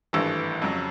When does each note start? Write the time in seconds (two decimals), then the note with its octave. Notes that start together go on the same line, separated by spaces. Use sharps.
0.13 G#1 G2 E3 A3
0.62 F2 C#3 F#3